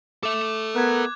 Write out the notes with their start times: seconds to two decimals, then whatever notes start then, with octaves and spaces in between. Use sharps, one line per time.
0.23 A4 E5 D6
0.75 B3 A#4 F#6 G#6